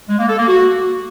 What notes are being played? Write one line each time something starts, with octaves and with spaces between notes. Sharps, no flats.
G#3
A#3
A4
A#3
F#4